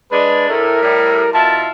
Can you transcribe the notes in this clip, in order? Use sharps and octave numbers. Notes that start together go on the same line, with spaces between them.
G#3 D4 B4
A2 A3 A#4
A2 G3
B2 E4 F4 A5